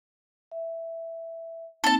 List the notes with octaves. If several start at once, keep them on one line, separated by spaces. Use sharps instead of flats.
E5
A#3 C4 D#4 A4 A5